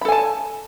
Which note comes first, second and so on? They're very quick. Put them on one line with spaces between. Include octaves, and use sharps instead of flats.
B5 A4 G#5 A5